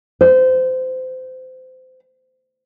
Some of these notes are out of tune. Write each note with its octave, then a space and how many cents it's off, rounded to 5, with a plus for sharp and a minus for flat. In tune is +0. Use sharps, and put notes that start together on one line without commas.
C5 -25